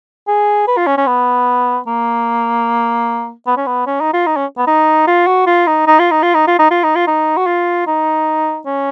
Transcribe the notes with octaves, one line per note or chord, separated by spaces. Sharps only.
G#4
B4
F4
C#4
C#4
B3
A#3
B3
C#4
B3
C#4
D#4
F4
D#4
C#4
B3
D#4
F4
F#4
F4
D#4
D#4
F4
D#4
F4
D#4
F4
D#4
F4
D#4
F4
D#4
F#4
F4
D#4
C#4